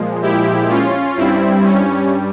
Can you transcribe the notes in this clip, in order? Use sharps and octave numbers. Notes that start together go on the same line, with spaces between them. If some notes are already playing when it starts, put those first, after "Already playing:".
Already playing: A#2 F3 G#3
E4 G4
C#4 F4
G2 G3 C4 E4
C#4